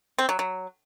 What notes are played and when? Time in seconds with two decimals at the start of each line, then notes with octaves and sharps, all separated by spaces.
0.19 C4
0.29 F#3
0.39 F#3